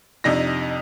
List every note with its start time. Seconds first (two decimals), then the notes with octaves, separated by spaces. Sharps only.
0.24 F2 C3 D4 D#4 A#6